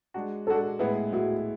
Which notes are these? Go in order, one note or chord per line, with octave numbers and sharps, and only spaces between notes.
G#3 D4 F#4
G#3 D4 F#4 A4
A2 G#3 B3 E4 G#4 B4
A2 G#3 B3 E4 F#4 G#4